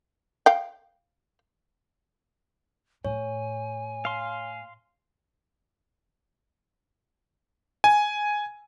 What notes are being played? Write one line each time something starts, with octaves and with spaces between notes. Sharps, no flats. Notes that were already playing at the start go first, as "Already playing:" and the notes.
F5 G5
A2 C#5 G#5
F5 C6
G#5